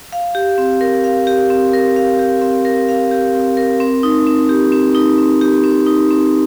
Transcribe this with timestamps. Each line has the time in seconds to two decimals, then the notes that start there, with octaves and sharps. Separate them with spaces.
0.13 F5
0.35 G4
0.58 C4
0.81 A#4
1.04 F5
1.27 G4
1.50 C4
1.73 A#4
1.96 F5
2.19 G4
2.42 C4
2.65 A#4
2.89 F5
3.11 G4
3.35 C4
3.57 A#4
3.80 C4
4.03 D#4
4.27 C4
4.49 G4
4.72 C4
4.95 D#4
5.18 C4
5.41 G4
5.64 C4
5.87 D#4
6.11 C4